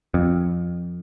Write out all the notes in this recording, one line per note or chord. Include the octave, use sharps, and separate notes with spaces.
F2